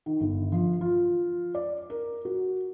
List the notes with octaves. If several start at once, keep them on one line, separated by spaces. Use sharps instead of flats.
D#3
G1
F3
F4
D5
A#4
F#4